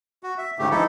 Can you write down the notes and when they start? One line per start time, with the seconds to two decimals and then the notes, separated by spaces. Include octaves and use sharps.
0.23 F#4
0.38 E5
0.59 D2 G#2 C#3 A3 G4
0.71 E3 F3 D#4 E4 A4